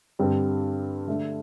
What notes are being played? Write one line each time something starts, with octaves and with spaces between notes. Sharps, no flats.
G2 D3 G3 C4
D3 A3 D4